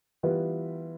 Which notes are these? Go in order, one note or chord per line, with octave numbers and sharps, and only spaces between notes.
E3 G3 B3 F4 B4